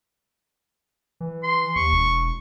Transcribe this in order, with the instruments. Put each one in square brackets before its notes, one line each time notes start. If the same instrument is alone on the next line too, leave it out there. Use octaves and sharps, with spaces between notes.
[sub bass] E3
[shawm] C6
[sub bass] D#2 [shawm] C#6
[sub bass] E1